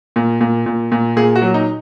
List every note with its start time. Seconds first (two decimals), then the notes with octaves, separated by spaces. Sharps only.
0.16 A#2
0.41 A#2
0.66 A#2
0.92 A#2
1.16 A#2 G#4
1.36 F#4
1.42 F#3
1.54 D#4